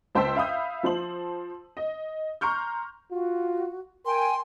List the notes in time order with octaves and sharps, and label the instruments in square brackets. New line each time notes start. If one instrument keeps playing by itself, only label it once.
[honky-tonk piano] C#2 C5 G5 A5 E6 B6
E5 F5 B5 D#6 G6
F3 C5 F#7
D#5
A#5 C6 C#6 F6 G6
[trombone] F4 [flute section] F#4
[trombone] A#4 [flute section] G5 G#5 [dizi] C6